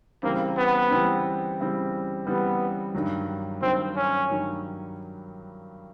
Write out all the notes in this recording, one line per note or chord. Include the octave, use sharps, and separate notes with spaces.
C#3 E3 G3 A#3 C4
B3
C#3 E3 G3 C4
C#3 E3 G3 C4
C#3 E3 G3 B3 C4
G2 D#3 F#3
G2 D#3 F#3 C4
C#4
G2 D#3 F#3